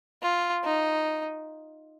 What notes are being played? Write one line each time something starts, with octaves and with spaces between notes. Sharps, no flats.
F4
D#4